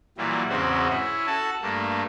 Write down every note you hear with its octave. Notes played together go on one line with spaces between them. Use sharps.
A#2 E3 F#3 G3
E2 G#2 C#3 C4 F#4
C#4 E4
F#4 A4 A5
G2 A3 A#3